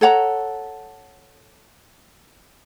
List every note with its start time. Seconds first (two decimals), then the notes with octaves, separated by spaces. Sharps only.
0.01 A4 C#5 F#5 A#5